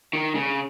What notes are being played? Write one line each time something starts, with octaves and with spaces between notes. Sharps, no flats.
D#3
C#3